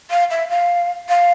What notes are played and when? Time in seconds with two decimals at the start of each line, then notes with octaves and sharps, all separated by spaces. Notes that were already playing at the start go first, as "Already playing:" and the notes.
0.10 F5
0.31 E5
0.50 F5
1.09 F5